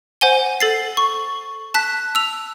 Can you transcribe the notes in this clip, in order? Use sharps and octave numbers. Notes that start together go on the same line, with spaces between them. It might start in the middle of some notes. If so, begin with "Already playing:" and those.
C5 F#5 G#5 G7
A4 A6 C7
C#6
A5 F#6 B6
E6 F7